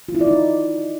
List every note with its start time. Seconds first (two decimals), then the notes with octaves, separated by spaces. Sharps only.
0.09 F4
0.15 E4
0.21 D5
0.27 D#4